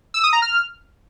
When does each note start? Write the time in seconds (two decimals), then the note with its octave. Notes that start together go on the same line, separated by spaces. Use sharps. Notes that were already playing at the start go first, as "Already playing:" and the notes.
0.14 E6
0.23 D#6
0.33 A#5
0.42 F6